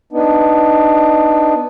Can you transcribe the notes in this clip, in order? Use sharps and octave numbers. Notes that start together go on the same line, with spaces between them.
B3 D4 D#4